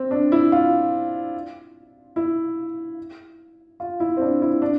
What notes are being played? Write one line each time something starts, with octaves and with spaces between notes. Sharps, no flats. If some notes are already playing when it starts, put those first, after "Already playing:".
Already playing: C4
D4
E4
F4
E4
F4
E4
C4
D4
E4
D4